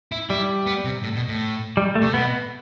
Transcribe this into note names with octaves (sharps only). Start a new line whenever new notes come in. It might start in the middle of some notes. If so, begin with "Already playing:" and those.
E4
G3 E4
B3
C3
A2
B2
A2
G3
A3
C3
B2 B3